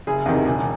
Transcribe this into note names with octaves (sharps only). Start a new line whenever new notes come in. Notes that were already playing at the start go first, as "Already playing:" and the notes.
F#1 G#4
E2 C3 D#3
E1